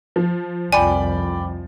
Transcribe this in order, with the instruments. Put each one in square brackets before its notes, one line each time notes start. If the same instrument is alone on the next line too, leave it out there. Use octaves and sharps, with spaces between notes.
[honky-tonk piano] F3
[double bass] C2 F2 [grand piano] D5 G5 B5 [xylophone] G#5